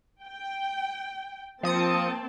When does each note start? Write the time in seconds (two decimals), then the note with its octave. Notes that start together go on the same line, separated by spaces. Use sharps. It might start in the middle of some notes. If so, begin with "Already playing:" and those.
0.22 G5
1.63 F3 A#3 C4 A5 D#6 C#7